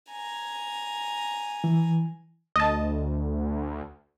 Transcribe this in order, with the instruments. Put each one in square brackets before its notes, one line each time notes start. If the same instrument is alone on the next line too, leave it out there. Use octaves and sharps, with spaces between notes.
[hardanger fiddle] G#5 A#5
[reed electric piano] E3
[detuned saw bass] D2 [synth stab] D#5 A5